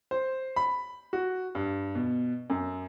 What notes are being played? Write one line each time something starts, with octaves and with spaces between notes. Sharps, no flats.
C5
B5
F#4
G2
B2
F#2